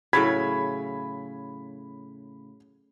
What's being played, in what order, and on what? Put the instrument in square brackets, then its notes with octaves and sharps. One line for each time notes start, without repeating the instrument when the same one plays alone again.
[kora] A2 C#3 F#3 [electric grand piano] B5 G#6 B6